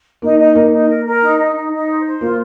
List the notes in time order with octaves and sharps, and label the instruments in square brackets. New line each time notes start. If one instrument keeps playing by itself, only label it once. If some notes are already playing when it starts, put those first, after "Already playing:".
[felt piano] A#3 [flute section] D#4
[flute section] D#4
[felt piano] A#3 [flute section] D#4
[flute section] D#4
A#4
A#4
D#4
D#4
D#4
D#4
C5
C5
[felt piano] A#3 [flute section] F4